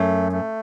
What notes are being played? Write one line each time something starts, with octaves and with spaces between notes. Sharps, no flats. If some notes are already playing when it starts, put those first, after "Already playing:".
Already playing: F#2 A3
A3